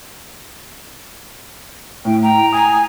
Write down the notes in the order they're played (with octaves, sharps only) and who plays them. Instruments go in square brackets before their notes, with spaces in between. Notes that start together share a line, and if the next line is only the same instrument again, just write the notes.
[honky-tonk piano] A2 [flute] G5
[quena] G5 [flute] A#5
[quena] G#5 [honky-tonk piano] D#6